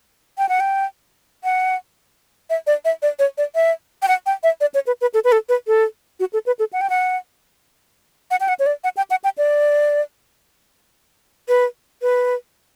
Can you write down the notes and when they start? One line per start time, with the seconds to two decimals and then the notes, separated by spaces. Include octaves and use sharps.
0.38 G5
0.49 F#5
0.60 G5
1.44 F#5
2.50 E5
2.67 D5
2.85 E5
3.02 D5
3.19 C#5
3.38 D5
3.55 E5
4.02 G5
4.08 F#5
4.26 G5
4.43 E5
4.61 D5
4.74 C#5
4.87 B4
5.01 B4
5.14 A4
5.24 B4
5.32 A4
5.49 B4
5.67 A4
6.20 F#4
6.33 A4
6.46 B4
6.59 A4
6.73 F#5
6.81 G5
6.90 F#5
8.31 F#5
8.40 G5
8.48 F#5
8.59 C#5
8.66 D5
8.84 F#5
8.97 G5
9.10 F#5
9.24 G5
9.38 D5
11.48 B4
12.02 B4